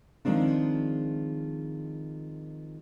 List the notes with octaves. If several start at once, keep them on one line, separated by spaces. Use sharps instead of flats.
D#3 F3 G#3 C4 D4